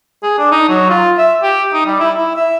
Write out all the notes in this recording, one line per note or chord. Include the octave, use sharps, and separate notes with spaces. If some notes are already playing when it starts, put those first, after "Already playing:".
G#4
D4
D#4
F#3
F4
E5
G4
D#4
G3
E4
E4
E5